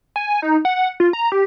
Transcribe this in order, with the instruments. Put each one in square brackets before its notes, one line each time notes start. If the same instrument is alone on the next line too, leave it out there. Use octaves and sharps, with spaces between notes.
[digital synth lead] G#5
D#4
F#5
F4
A#5
G4